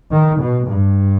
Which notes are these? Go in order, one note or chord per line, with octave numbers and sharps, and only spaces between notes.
D#3
B2
G2